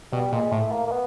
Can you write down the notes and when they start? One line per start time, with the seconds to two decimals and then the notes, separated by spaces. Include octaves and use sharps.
0.12 B2 G3
0.32 A#2 G#3
0.52 A2 A3
0.71 A#3
0.87 A#3
0.91 B3